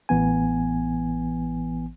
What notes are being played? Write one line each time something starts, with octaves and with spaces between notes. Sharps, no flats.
A1 E3 B3 G#5